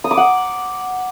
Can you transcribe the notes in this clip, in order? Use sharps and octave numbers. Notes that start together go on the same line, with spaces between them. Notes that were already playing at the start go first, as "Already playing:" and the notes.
D#6
D6
F#5